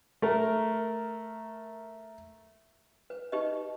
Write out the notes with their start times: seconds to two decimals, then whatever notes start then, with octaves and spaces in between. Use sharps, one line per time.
0.22 A3 A#4
3.10 B4
3.32 D#4 G4 B4 D#5